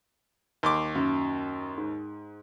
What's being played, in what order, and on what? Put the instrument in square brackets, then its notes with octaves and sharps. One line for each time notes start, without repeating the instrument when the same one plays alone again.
[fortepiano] D#2 C6 D6
[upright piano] F#2
G#2